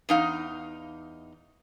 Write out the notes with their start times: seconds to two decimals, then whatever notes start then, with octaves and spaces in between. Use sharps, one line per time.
0.09 E2 D#4 F5